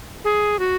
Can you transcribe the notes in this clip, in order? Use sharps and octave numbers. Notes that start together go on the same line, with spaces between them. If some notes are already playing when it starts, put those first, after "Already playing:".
G#4
F#4